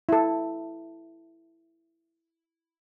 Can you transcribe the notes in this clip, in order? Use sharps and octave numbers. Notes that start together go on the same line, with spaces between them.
E4 A4